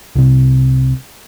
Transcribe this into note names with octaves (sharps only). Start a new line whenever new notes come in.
C2 C3